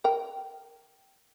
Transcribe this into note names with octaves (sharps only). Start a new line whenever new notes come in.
A#4 G5